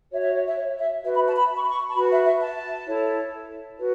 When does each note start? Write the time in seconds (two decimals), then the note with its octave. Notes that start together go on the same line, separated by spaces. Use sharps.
0.11 F#4 C#5 E5
0.23 E5
0.34 C#5
0.46 E5
0.57 C#5
0.80 E5
1.03 F#4 B4 E5
1.14 B5
1.26 A5
1.37 B5
1.56 C#6
1.63 B5
1.70 C#6
1.89 A5
1.94 F#4 B4 B5
2.10 E5
2.26 E5
2.41 A5
2.86 E4 A4 C#5
3.78 F#4 B4